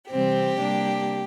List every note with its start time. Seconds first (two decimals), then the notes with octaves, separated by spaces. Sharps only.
0.10 C3 E3 G3 C4 G4
0.58 C3 G3 A#3 D4